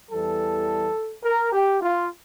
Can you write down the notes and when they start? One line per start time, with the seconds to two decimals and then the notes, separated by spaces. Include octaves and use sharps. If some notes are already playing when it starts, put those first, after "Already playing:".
0.11 E2 E3 G3 A4
1.24 A#4
1.52 G4
1.81 F4